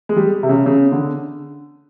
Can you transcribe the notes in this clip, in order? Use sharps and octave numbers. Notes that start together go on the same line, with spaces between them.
G#3
G3
C3
C#3
C#3
D3